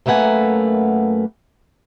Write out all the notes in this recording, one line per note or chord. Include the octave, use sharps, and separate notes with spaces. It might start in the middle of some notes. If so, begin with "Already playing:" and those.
F#2 A3 A#3 B4 F#5 G#5